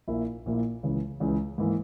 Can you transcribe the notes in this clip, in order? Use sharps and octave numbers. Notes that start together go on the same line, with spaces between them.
A#1 A#2 A#3 E4
A#1 A#2 A#3 E4
C#2 C#3 E3
C#2 C#3 E3
G#2 E3 A#3